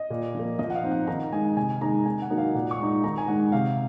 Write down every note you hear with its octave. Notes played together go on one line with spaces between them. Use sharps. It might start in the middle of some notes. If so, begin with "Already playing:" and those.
Already playing: D#5
A#2
F3 A#3
F3 D#5
F#5
F5
C4 D#4
F#5
D#3 A#5
G#3 D#4 G#5
C3 G#5
D#3 G#3 D#4 A#5
D#3 G#5
F#5
F#3 A#3 D#4
F5
A#2 F#5
C#6
G#3 D#4
D#3 A#5
G#5
G#3 D#4 F#5
C3 F5